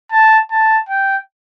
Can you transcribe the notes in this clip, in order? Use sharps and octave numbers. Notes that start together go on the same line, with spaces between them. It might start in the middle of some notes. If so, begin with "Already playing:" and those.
A5
A5
G5